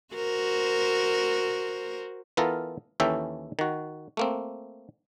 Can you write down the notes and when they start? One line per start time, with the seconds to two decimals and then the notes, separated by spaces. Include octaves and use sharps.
0.14 F#4 A#4 C5
2.37 E3 B3 F4 A4 A#4
3.00 D#2 E3 C#4 A4 E5 G5
3.59 D#3 F#4
4.17 A3 A#3 C4